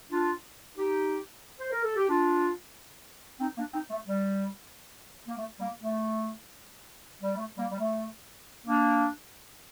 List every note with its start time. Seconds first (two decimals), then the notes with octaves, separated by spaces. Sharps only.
0.11 D4 F4
0.77 D#4 G4
1.58 C5
1.72 A#4
1.84 A4
1.96 G4
2.08 D4 F4
3.40 C4 D#4
3.57 A#3 D4
3.73 C4 D#4
3.90 A3
4.06 G3
5.28 A#3
5.38 A3
5.59 G3 A#3
5.82 A3
7.21 G3
7.36 A3
7.57 G3 A#3
7.71 G3
7.79 A3
8.67 A#3 D4